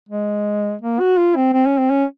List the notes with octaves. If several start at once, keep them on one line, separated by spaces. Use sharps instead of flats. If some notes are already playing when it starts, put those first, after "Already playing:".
G#3
A#3
F#4
F4
C4
C4
C#4
C4
C#4